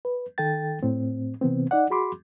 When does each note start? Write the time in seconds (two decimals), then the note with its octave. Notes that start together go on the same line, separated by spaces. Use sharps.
0.05 B4
0.38 D#3 A4 G5 A6
0.83 A2 C4
1.41 C3 E3 B3 C4
1.71 D#4 D5 F#5
1.90 F#4 G#4 B5 C6 D6